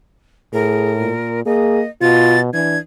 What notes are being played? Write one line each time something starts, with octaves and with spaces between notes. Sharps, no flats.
A2 G#4 A#4
A#2
A#3 G#4 D#5
B2 F4 A6
E3 D4 G#6